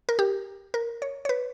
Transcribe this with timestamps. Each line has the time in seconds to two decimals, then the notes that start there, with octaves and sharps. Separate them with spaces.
0.09 A#4
0.19 G4
0.74 A#4
1.02 C#5
1.25 C#5
1.29 B4